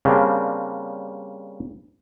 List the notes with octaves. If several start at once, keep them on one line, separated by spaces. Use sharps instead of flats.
C#3 G3 A#3 C4 D4